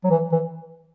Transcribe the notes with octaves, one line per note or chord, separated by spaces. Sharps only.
F#3
E3
E3